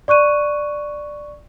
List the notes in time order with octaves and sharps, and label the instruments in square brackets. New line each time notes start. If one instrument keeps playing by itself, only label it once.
[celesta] D5 C#6 F#6 D#7